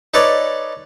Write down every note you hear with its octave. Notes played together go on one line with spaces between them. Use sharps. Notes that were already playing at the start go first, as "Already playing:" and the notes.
D#4 A4 B4 C#5 D5